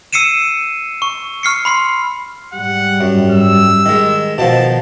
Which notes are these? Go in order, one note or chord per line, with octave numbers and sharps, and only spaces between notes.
E6 C7 C#7 D#7 E7
C#6
C#6 F6 C7 C#7
B5 C6 C7
G#2 G3 F#5
F#2
E6
D#3 G#3
B2 D#3 F3 A5